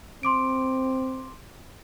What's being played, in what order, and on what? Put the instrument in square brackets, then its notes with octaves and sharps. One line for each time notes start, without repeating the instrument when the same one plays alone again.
[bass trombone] C4 [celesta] C6 D6 D7